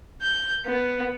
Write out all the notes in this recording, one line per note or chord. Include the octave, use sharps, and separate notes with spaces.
G6
B3